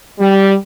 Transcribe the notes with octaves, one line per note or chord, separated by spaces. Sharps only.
G3